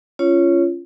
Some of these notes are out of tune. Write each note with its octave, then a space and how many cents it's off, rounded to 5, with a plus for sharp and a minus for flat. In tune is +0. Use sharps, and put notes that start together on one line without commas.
C#4 +0 F4 -25 C#5 +0